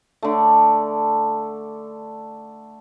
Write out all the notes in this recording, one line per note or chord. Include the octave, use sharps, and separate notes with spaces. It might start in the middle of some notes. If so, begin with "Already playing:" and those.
D3 A3